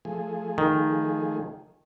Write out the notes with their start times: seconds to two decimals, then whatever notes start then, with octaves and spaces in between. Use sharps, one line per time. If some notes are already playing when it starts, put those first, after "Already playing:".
0.05 F3 A3 G#4
0.58 D#3